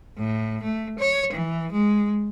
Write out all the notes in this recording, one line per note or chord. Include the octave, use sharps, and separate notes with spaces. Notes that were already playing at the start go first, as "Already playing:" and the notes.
A2
A3
C#5
E3
G#3